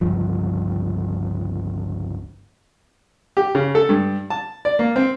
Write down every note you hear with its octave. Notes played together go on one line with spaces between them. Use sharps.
G1 C#2 G2 F3
G4
C#3
A4
G2
A5
D5
A#3
C4